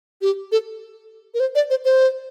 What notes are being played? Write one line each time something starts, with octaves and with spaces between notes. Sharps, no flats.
G4
A4
A#4
C5
D5
C5
C5